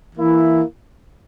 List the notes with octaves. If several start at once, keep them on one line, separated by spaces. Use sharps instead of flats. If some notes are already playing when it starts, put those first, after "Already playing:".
E3 A#3 E4